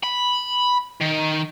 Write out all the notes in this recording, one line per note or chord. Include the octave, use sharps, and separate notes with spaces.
B5
D#3